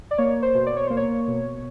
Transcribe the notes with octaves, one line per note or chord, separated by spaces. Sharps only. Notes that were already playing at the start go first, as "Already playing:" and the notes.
D5
A#3 C#5
C5
B2
D5
C#5
A#3 C5
C#5
B2